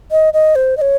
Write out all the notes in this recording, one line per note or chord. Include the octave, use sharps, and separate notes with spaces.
D#5
D#5
C5
D#5
C#5